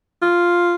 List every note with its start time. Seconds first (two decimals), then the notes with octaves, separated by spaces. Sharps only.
0.22 F4